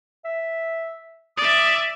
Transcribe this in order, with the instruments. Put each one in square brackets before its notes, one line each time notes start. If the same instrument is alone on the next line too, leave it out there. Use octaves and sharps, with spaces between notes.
[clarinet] E5
[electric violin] D5 E5 [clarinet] D#6